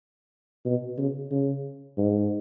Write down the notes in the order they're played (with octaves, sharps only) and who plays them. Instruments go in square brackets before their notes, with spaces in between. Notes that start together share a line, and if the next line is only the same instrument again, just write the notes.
[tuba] B2
C#3
C#3
G#2